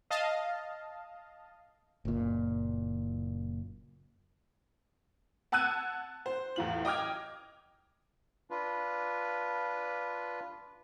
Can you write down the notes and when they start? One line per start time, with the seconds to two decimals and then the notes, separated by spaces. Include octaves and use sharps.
0.10 D#5 F5 A5
2.05 F#1 A#2
5.52 F#5 A5 E6 F#6 G#6 D#7
6.26 C5
6.56 E2 A2 F4 F#7
6.85 D#5 G5 D6 F6 G#6
8.51 D4 F4 B4